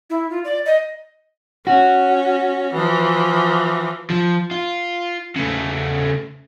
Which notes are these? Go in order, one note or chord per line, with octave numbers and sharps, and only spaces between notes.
E4
F4
D5
D#5
C#4 F#4
E3 F3
F3
F4
C#3 A3